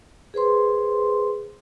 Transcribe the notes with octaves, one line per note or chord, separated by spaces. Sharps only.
G#4 B4 C5 C6